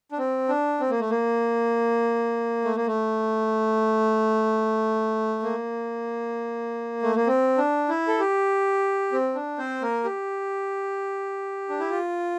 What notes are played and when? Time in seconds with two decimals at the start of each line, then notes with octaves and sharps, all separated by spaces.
0.12 D4
0.18 C4
0.49 D4
0.80 C4
0.90 A#3
1.00 A3
1.10 A#3
2.65 A3
2.76 A#3
2.87 A3
5.43 A#3
7.03 A3
7.16 A#3
7.27 C4
7.58 D4
7.89 E4
8.08 A4
8.19 G4
9.12 C4
9.35 D4
9.58 C4 C5
9.82 A#3 A#4
10.04 G4
11.69 D4
11.80 E4
11.90 F4